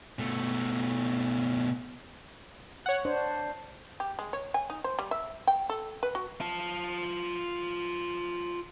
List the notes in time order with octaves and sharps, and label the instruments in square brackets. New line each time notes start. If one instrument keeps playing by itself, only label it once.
[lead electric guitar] B2 A3
[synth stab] C#5 F#5
[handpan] D4 C5
[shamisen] G4
G#3
C#5
G#5
D#4
C5
G3
E5
G5
A4
B4
F#4
[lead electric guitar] F4 A5